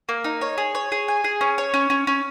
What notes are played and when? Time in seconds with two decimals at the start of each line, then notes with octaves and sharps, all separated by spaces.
0.09 A#3
0.24 D#4
0.41 C#5
0.58 G#4
0.75 C#5
0.92 G#4
1.08 G#5
1.24 G#4
1.41 C#4
1.58 C#5
1.74 C#4
1.90 C#4
2.07 C#4